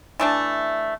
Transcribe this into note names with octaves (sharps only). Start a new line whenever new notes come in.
E3 A3 D4